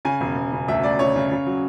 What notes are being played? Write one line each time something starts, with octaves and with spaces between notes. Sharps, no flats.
C#3 G#5
E1
E1
C#3
D2 E5
D2 D5
C#3 C#5
C#3
C#3
F#3